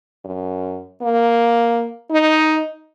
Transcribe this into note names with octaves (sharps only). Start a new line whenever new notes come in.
F#2
A#3
D#4